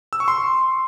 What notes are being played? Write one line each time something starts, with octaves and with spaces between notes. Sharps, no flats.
E6
C#6
C6